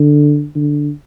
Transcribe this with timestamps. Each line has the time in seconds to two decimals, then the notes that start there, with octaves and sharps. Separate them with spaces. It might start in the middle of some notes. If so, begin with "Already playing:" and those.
Already playing: D3
0.55 D3